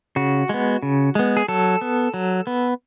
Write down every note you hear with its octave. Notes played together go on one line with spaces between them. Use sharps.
C#3 F#4
G#3 B3
C#3
G#3 B3
G#4
F#3 A4
B3
F#3
B3